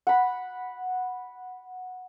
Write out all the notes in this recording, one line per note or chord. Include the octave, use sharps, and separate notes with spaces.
F#5 B5